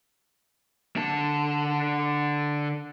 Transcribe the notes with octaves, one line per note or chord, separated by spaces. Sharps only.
D3 A5